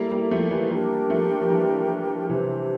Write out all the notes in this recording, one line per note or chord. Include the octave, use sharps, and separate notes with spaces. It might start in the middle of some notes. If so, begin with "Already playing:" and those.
Already playing: G3 A#3 E4 A4 E5
G3 A#3
F3 A3
E3 G3
G3 A#3 D4 G4 A#4
F3 A3
F3
E3 G3
C3 E3 D4 G4 C5